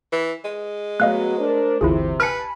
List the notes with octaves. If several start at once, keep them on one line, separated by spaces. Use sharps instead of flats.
E3
G#3
F#3 A3 B3 D#5 F5 F#6
D4 A#4 C5
G1 D2 C3 E3 E4 F4 G#4
B4 G#5 A5 B5 F6 C#7